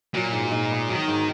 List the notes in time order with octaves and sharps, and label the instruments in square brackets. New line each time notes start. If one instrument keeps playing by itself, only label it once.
[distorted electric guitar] A#2 [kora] F#3
[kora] G#2
G#2
B3
[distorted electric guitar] D#3 [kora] F#3
[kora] G#2